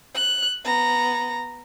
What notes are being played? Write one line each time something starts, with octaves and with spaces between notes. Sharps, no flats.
F#6
B3 A#5